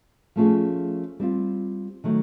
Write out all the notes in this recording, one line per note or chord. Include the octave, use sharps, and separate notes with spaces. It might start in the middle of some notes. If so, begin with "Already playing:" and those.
F3 A3 C#4 F4 G#4
G3 C4 F4
D#3 F#3 A3